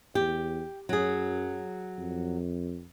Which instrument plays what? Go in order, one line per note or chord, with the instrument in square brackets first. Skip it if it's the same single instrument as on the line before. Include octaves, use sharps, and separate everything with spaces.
[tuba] E2 [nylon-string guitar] G4
[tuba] F#2 [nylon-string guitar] F#3 G#4
[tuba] F2